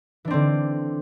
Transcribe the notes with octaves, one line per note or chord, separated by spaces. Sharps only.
D3 E3 C4 D4